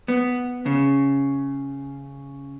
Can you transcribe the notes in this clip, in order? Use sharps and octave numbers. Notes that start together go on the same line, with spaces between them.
B3
C#3